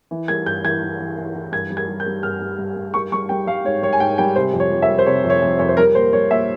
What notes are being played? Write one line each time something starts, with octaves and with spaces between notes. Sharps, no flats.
E3
G3 G#6
G2 G6
E3 G#6
E3
E3
E3
E3
G2 G#6
G3
G#6
G3
G6
G3
G2 F6
G3
G2
G2
G3 C#6
G3 C#6
G3 G5
G3 F5
G#2 C#5
G3 C#5
G#5
G#2 G5
G3 G5
C3 C5
F2
C#5
F2
E5
G3
C5
C3 C#5
F2
C#5
F2
F2 C#5
C5
G3 A#4
A#2 C5
G3 C#5
A#2 E5